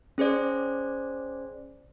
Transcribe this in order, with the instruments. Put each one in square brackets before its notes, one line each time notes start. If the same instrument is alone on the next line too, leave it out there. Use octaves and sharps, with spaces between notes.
[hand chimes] C#4 G#4 C5 D5